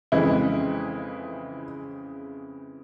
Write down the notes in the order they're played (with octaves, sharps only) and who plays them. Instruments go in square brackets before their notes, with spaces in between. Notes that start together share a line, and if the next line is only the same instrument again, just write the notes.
[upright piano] F2 C#3 E3 G#3 E4